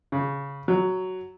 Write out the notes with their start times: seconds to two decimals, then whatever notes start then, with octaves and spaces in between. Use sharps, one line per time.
0.12 C#3
0.68 F#3